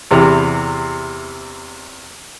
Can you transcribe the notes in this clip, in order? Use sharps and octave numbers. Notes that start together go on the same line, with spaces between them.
E2 C3